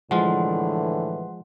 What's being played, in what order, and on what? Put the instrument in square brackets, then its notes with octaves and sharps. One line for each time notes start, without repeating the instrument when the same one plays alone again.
[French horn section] A2 D3 E3 [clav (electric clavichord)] F3 G#3 F4 [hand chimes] F#5 C6